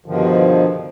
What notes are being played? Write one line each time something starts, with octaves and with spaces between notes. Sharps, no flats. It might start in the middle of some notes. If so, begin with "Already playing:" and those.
G2 B2 D3 D#3 F3